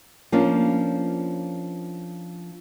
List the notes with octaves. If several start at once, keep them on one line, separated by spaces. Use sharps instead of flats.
F3 A#3 C#4 D4 F4